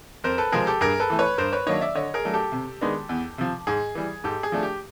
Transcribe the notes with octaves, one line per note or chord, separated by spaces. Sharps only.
F2 A#4 C5
A4 B4
C3 F3 G#3 C4 G#4 A#4
G4 A4
G2 G#4 A#4
A4 B4
E3 A3
B4 C#5
G2 A#4 C5
B4 C#5
D#3 F#3 A#3 D4 C#5 D#5
D5 E5
D3 C#5 D#5
G#4 A#4
F#3 A3 D4
G4 A4
C3
D#3 G#3 B3 D4
E2
C3 F3
G#2 G#4
E3 G3
G#2 G4 A4
G#4
F3 A3 D4
G4